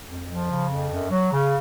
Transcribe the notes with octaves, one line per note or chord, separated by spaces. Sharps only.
F2
F3
C#3
F2
F#2
F#3
C#3